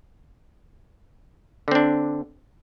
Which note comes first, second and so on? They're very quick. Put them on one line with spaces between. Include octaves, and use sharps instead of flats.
D3 C4 D4